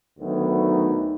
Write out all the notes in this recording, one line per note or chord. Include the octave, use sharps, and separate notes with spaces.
D2 D#3 F#3 B3